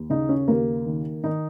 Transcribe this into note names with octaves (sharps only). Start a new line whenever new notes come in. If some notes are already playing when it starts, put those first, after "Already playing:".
Already playing: D#2
C#3 D#4
C#4
D#2 A#3
D#3
D#3 D#4